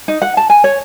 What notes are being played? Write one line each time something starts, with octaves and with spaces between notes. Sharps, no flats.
D#4
F#5
A5
G#5
C#5